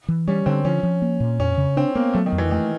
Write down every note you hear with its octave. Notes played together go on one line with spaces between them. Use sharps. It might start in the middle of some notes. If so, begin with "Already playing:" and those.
E3
G3 C#4
D3 C4
F3 C#4
F3
A#3
A#2
F2 C#4
C#3
C4 D4
A#3 B3
F#3 A3
D#3
F2
E3
D#3 A3